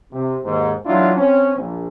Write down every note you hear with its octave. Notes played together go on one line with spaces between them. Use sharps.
C3
D#2 G#2
A1 F#3 D4 E4 F4
C4 C#4
A#1